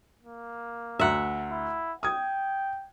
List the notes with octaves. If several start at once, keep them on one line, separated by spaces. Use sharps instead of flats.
A#3
D2 E5 F#5 A#5
E4
G5 D#6 G#6